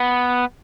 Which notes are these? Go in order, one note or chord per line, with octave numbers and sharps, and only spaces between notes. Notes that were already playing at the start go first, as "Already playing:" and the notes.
Already playing: B3